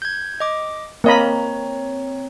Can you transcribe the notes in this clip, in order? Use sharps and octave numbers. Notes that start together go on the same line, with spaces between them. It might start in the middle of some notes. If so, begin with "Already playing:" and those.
G6 G#6
D#5 D6
A#3 C4 C#5 D#5 A#5 B5